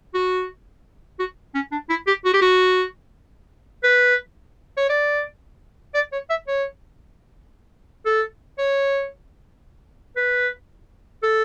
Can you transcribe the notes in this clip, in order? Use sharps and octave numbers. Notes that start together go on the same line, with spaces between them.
F#4
F#4
C#4
D4
E4
G4
F#4
G4
F#4
B4
C#5
D5
D5
C#5
E5
C#5
A4
C#5
B4
A4